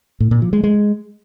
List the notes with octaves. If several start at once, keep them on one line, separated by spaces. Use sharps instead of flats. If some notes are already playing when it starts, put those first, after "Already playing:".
A2
A#2
F3
G#3
G#3